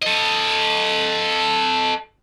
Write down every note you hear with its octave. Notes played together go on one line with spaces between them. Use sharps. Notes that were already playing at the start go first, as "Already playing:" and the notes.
A4 D#5